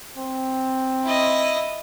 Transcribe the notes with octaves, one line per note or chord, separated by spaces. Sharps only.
C4
E4 D#5